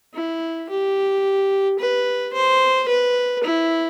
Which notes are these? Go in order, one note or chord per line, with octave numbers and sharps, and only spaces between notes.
E4
G4
B4
C5
B4
E4